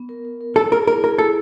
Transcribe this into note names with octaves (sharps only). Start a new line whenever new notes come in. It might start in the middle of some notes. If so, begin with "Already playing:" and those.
Already playing: B3
A#4
A#4
A#4
G#4 A4
G#4 A#4
E4 A#4
G#4 A#4
E4 A4